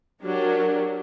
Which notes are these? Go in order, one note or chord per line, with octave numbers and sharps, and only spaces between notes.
F#3 D4 G4 A#4